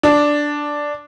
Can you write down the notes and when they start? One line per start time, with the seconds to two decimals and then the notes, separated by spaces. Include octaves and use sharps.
0.03 D4